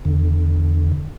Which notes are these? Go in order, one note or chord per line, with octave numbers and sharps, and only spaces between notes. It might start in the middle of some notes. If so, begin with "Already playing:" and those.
E2 D3